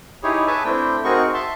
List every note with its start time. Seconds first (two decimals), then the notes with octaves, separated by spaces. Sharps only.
0.23 D#4 E4 G4 G#4 C#5
0.47 B4 C#5 E5 G#5 A5
0.64 A3 C4 D4 E4 G5
1.04 C4 D#4 F#4 G#4 A#4 C#6
1.34 E5 A5 C6